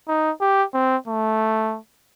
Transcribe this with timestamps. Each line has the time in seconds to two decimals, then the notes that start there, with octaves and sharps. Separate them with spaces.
0.08 D#4
0.41 G4
0.74 C4
1.08 A3